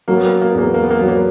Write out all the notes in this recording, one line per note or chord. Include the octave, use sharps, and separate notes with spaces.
F#3 A#3
B3
A#3
B3
A#3
B3
E2 A#3
B3
A#3
B3
A#3
F#3 B3
A#3
B3